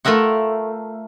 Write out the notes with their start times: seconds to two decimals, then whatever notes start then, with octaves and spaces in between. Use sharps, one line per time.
0.05 A3 F4 A#4 E5 F#5